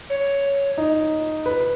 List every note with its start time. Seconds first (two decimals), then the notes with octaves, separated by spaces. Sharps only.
0.10 C#5
0.78 D#4
1.46 B4